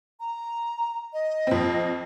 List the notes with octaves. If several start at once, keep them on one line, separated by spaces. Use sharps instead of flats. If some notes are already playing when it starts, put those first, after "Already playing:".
A#5
D#5
F2 C4